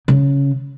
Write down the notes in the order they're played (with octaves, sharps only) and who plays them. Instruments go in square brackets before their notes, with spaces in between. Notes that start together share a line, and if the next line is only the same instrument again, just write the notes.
[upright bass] C#3